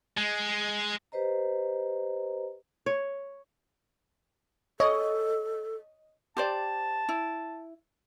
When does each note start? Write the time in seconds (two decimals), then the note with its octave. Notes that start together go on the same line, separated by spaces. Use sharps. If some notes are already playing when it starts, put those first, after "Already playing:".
0.18 G#3
1.12 G4 B4 C5 D#5 A#5
2.86 C#5
4.80 A4 C#5 D#5
6.37 G4 C5 D5 A5
7.09 E4